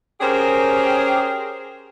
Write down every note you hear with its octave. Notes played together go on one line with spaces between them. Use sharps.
C#4 G4 G#4 A#4 C5